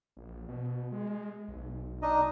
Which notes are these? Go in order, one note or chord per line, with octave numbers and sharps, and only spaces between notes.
A#1
B2
G#3
B1
D4 D#4 D#5